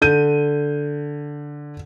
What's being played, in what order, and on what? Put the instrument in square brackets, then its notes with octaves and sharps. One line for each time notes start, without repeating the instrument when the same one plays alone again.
[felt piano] D3 G6 D#7